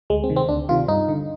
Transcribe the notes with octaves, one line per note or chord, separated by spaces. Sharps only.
D2 G#3
C4
C3 D#3
C4
D2 D4
C3 D#3 F4
G2 D#4
D3